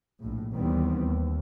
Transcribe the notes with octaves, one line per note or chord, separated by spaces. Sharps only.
A#1 A2
D#2 D#3 E3 G3 B3 C4
D#2